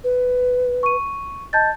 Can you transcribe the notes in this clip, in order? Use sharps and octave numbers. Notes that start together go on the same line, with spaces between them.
B4
C#6 D#7
D#5 A5 G6 A6